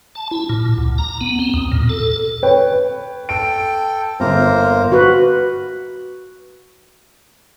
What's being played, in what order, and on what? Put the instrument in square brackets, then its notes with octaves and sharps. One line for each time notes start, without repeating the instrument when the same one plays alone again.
[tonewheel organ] A5
E4
A#2
D2
A#5
B3
C4
D#2
A#2
A4
[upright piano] B4 C#5 G5
[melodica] A4 G5 [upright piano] D7
[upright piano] G1 [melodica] A#3 A#4 C5
[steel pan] F#4 B4